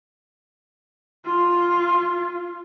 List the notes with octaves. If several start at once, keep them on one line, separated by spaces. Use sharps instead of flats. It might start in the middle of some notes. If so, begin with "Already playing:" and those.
F4